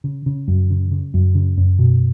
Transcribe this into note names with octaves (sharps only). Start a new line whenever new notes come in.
C#3
C#3
F#2
C#3
C#3
F#2
C#3
F#2
B2